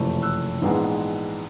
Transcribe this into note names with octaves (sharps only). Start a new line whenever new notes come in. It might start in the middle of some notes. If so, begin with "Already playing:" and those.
Already playing: F#1 F2 C3 E3 A3
E6 F#6
A#1 G#2 E3 G#3 B3